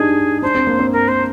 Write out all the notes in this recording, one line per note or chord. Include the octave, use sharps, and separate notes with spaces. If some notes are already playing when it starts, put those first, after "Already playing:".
Already playing: D4 D#4 G4 G#4
D4 C5
C4
A#3
C4
A#4
C5